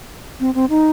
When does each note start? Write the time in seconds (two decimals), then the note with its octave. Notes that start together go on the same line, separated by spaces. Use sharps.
0.40 C4
0.55 C4
0.70 D#4